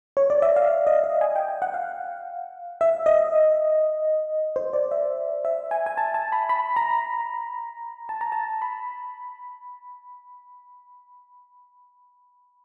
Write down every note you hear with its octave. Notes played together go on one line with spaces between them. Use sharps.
C#5
D5
E5
F5
D#5
D#5
G#5
G5
G5
F#5
F5
E5
D#5
C5
D5
E5
E5
G#5
G#5
A5
A5
B5
B5
A#5
A5
A#5
A5
B5